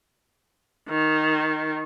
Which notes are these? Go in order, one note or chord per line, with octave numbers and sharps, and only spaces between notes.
D#3